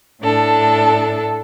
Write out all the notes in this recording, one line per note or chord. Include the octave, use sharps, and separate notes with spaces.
A2 D4 A4